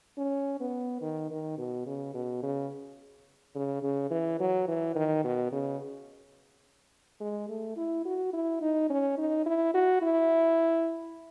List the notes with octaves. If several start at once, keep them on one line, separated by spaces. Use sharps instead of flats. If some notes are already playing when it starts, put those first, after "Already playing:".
C#4
B3
D#3
D#3
B2
C#3
B2
C#3
C#3
C#3
E3
F#3
E3
D#3
B2
C#3
G#3
A3
E4
F#4
E4
D#4
C#4
D#4
E4
F#4
E4